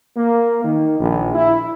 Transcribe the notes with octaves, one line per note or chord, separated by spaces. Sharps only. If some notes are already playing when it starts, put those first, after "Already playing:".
A#3
D#3
A#1
E4